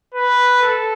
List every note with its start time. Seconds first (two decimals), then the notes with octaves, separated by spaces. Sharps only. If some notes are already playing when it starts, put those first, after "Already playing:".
0.15 B4
0.62 A4